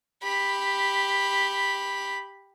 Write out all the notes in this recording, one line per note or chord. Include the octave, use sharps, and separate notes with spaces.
G4 B5